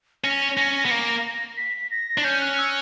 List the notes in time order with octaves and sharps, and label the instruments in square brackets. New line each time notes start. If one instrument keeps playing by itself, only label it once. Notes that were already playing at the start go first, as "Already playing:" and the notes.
[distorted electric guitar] C#4 [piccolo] A#6
[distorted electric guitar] C#4
B3
A#3
[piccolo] B6
A#6
[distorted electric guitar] D4
[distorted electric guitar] C#4 [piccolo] G6
[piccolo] F#6
E6